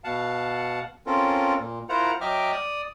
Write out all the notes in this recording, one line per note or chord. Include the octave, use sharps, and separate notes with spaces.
B2 F5 F#5 A5
C4 C#4 F4 A4 A#4
A#2
E4 F4 A#4 C5 F#5 A#5
F#3 D#5 E5 G5 D6 F6
D5 D#6